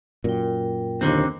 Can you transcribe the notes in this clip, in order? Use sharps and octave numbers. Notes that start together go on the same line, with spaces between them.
F#2 A#2 A#4 G5
D#2 D3 D#3 C4